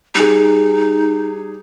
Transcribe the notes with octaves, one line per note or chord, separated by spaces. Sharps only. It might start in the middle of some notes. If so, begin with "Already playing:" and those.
G3 D#4 G#4